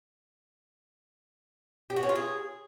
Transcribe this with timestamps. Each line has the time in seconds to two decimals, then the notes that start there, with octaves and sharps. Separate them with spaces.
1.90 G4
1.96 F#4
2.03 C#4
2.09 F4
2.15 G#4